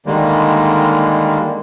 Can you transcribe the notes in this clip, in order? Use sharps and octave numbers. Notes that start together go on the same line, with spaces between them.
D3 D#3 G3 G#3 A#3